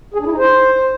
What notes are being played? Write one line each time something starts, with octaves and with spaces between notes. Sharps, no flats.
G#4
D4
E4
D#4
C5